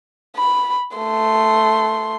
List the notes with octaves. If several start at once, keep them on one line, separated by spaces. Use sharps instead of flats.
B5
A3 C6